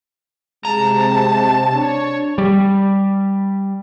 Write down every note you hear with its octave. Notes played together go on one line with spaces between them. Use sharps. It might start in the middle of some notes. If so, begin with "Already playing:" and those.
C3 G#3 A5 A#5
D4 C#5
G3